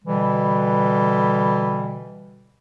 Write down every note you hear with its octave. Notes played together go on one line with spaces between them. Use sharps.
B2 D3 E3 G3